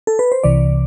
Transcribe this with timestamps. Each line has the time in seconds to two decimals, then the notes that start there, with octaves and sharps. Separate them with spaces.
0.07 A4
0.19 B4
0.32 C5
0.43 C2 C3 E3 D5